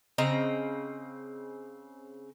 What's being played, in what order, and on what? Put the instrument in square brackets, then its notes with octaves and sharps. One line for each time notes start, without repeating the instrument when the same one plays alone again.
[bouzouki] C#3 C4 D#5 A#5